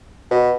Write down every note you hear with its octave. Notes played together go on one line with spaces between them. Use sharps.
B2